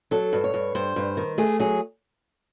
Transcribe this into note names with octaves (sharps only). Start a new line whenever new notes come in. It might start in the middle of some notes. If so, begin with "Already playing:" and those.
F#3 A4
G2
C#5
G2
G2 C5
G2
D#3
A3 G#4
F#3 G#4